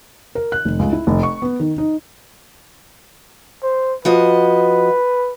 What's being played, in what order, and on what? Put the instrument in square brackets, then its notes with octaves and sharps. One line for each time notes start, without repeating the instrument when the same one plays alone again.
[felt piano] A#4
F#6
F1
C#2
E4
F1
C#6
B3
D#3
D#4
[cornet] C5
[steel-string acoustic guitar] F3 F#4 D#5 [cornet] B4